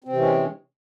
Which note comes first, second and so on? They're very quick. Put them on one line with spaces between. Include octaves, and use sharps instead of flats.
C4 C3 E3 C#4 G#3